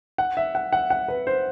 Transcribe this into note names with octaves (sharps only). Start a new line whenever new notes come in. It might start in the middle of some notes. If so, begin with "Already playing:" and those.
F#5
E5
F#5
F#5
F#5
B4
C5